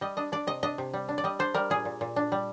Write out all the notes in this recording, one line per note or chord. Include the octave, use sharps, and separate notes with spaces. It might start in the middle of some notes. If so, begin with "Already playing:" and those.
G3 D#5
D4 D#5
D4 D5
C3 D#5
D4 D#5
C3
G3
D4
D5
G3 D#5
D4 C5
G3 A#4
A#2 G#4
A#2
A#2
D4
G3